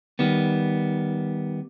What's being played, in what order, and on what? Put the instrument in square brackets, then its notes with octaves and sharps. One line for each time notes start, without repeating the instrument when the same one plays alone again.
[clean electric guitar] D#3 G3 B3